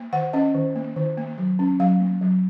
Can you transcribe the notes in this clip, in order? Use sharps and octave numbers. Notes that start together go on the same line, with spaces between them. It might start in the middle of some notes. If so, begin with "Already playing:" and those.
Already playing: A#3
D#3 F#5
C#4 D#5
D#3
A#3
D#3
A#3
F#3
C#4
F#3 F5
A#3
F#3